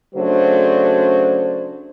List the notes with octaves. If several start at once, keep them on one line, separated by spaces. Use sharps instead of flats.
C#3 F#3 A3 D4 C5